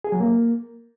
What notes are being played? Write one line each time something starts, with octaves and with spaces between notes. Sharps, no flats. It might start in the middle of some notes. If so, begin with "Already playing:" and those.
G#4
F#3
A#3